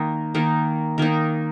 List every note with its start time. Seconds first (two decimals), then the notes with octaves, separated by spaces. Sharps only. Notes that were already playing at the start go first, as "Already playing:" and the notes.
Already playing: D#3 A#3 D#4
0.34 D#3 A#3 D#4
0.98 D#3 A#3 D#4